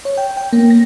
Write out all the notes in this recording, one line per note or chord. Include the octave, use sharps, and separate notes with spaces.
C#5
G5
G5
A#3
A#6